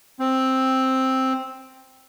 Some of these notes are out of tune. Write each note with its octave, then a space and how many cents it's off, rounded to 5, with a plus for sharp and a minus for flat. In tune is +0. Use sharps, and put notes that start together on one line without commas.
C4 +5